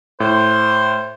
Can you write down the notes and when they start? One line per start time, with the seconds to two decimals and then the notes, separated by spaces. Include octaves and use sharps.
0.20 A2 C5